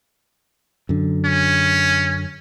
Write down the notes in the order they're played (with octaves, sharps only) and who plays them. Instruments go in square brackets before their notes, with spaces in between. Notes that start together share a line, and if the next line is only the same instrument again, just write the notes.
[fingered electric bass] F#2 D3
[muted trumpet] C#4